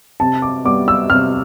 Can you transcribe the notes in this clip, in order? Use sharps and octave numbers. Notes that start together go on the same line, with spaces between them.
C3 A5
D6
G3 B3 D6
E6
C3 F6